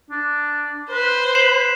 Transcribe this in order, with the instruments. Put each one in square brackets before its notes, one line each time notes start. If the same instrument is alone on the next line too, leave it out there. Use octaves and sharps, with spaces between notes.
[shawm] D4
[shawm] B4 [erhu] C5
[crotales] C7 E7 F#7